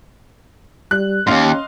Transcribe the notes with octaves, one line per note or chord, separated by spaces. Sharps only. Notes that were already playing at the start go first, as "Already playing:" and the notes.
G3 F#6
D#2 G#2 C#4 D#5 F5 C6